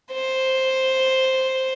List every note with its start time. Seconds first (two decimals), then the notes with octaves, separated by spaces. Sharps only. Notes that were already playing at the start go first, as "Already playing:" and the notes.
0.13 C5